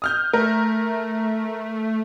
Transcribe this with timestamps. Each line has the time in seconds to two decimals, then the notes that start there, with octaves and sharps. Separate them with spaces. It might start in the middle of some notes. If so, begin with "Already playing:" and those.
0.02 D#6 F6 G6
0.33 A3 A#4